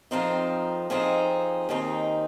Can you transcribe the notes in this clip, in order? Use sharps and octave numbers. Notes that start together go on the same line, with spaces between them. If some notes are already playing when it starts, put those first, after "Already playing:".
F2 F3 C4 D#4 A#4
F2 F3 C4 D#4 G#4
D#2 D#3 C4 D#4